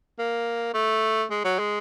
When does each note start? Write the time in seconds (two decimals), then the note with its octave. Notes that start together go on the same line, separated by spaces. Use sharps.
0.19 A#3
0.74 A3
1.31 G#3
1.44 F#3
1.59 G#3